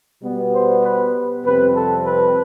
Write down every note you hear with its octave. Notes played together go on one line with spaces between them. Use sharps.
B2 G3 B3
C5
B4
F2 C3 G3 C4 B4
A4
B4